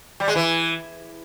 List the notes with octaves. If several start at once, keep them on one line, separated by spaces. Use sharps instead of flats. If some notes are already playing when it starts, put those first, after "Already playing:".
G3
G#3
E3